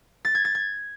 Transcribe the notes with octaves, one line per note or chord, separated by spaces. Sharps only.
A6
G#6
A6
G#6